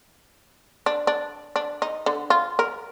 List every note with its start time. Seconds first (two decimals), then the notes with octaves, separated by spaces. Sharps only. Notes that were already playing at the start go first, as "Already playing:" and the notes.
0.86 D4
1.07 D4
1.56 D4
1.82 D#4
2.06 D3
2.30 F4
2.59 A#4